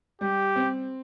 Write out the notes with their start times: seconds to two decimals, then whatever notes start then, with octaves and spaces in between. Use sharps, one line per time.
0.21 G3 G4
0.56 C4